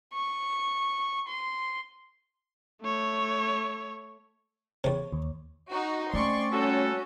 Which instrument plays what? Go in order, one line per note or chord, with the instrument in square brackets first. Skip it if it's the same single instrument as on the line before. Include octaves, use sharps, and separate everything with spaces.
[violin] C#6
C6
[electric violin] A3 C#5
[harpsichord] E2 C3 [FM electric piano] C#5
[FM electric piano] D#2
[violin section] D#4 F#4
[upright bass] A3 [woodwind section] C4 C#4 D5 [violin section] C6 C#6
[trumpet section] G3 C4 A4 [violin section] C#4 [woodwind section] F#4